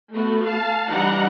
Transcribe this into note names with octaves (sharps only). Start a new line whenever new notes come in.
A3 B3 F#4
F5 A5
E3 G3 D4 D#4 F#5 A#5